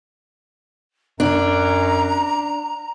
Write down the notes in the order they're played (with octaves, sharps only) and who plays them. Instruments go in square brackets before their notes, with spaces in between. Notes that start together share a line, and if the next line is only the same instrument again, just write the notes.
[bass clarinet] F#2 [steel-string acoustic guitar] D4 [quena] A#5